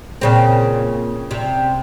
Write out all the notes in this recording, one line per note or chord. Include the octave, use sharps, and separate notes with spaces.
A#2 C#3 C4
C3